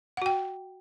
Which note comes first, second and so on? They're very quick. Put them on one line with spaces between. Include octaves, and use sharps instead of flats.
F#5 F#4 G5